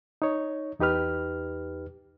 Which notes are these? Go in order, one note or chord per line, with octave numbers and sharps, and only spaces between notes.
D#4 C#5
E2 D#4 G4 B4 F6